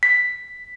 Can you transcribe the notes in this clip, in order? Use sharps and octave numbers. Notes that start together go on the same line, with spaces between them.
B6